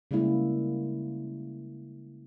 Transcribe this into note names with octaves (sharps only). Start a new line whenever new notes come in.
C#3 G3 G#3 A#3 E4